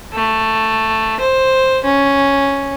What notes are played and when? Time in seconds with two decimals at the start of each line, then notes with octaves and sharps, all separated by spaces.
0.14 A3
1.20 C5
1.85 C#4